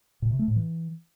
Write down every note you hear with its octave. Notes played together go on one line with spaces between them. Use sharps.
A#2
C3
A3
A2
E3